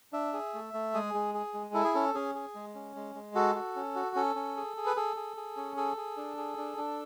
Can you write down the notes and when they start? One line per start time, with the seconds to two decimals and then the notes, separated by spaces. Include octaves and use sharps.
0.13 D4 E5
0.33 G#4
0.54 A3
0.74 A3
0.94 G#3 G#4
1.14 G#3
1.34 G#4
1.54 G#3
1.74 E4 A4
1.84 G#4
1.94 C#4 A4
2.14 C#4 G#4
2.35 G#4
2.55 G#3
2.75 C#4
2.96 G#3
3.15 G#3
3.35 F#4 A4
3.55 F#4
3.76 C#4
3.95 F#4
4.16 C#4 A4
4.36 C#4
4.57 G#4
4.77 G#4
4.86 B4
4.96 G#4 A4
5.16 G#4
5.37 G#4
5.57 C#4
5.76 G#4 A4
5.97 G#4
6.17 D4
6.37 G#4
6.58 D4
6.77 D4